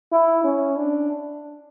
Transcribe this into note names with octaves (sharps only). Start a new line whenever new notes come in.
E4
C#4
D4